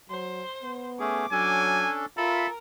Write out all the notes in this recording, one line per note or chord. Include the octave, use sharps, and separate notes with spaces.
F#3 C5
B3
A3 C#4 G#4 D6
F#3 C#4 D4 A4 G#5
F4 A4 A#4 E5 B5